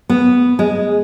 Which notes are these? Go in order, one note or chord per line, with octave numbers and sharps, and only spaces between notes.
B3
G#3